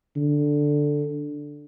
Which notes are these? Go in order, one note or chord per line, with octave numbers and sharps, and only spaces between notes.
D3